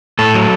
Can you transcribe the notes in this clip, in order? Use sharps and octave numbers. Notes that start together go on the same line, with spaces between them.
A2 A4
F#3